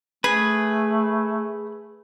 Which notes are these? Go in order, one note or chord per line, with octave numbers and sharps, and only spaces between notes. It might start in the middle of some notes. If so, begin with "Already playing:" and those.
A3 G#4 B4